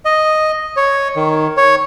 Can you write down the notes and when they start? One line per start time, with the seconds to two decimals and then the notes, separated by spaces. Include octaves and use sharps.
0.05 D#5
0.77 C#5
1.16 D#3
1.57 C#5